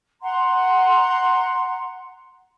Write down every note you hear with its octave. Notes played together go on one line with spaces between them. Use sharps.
F#5 A#5 C6